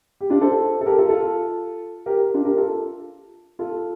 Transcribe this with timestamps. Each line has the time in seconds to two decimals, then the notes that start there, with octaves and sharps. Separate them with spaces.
0.21 G4
0.30 D4 F4
0.41 A4 C5
0.81 A4
0.86 G4 A#4
0.99 F4 A4
1.09 F4 A4
2.06 G4 A#4
2.34 D4 F4
2.45 G4 A#4
2.57 F4 A4
3.59 F4 A4